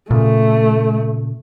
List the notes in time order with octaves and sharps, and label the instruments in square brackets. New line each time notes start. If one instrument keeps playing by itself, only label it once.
[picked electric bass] A#2 C#3 [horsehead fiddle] A3